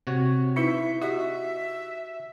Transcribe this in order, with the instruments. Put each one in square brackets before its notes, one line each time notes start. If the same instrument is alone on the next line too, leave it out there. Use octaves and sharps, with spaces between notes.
[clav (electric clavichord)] C3 F#4 C#5
[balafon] D#4 E4 B4 [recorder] E5
[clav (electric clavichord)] F#4 [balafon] G4 D#5 [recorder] E5